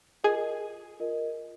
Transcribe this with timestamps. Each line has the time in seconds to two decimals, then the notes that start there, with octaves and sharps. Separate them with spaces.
0.24 F4 G#4 A#4 D#5
1.00 F4 A#4 D#5